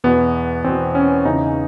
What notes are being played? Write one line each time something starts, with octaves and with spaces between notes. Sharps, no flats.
E2 B2 B3
E2 B2 C4
C#4
E2 C#3 E3 D#4